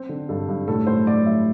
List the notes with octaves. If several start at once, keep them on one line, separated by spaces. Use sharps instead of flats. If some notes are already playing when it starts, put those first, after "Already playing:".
Already playing: C4 C5
D3
G2 A4
G2
A2 A4
A2 C5
A2 D5
G3 E5